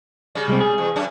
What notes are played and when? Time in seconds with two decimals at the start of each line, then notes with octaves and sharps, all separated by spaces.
0.35 C#3 G3
0.48 C2 G#3 C4
0.60 G#4
0.78 E2
0.96 F#2 C#4 D4